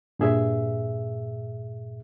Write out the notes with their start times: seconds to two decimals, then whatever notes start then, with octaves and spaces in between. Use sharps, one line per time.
0.19 G2 A#2 G#4 E5